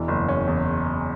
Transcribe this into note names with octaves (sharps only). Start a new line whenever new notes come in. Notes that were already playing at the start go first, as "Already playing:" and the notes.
Already playing: E1 E3
F#1
C#4
E2